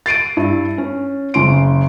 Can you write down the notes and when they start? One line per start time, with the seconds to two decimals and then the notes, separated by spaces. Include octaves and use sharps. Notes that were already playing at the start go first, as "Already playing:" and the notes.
0.06 A6 C7 D7 D#7
0.37 G2 E4
0.78 C#4
1.34 F#1 C#3 C6 D7